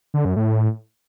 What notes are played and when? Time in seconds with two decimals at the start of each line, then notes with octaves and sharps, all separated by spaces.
0.14 D3
0.25 F#2
0.36 A2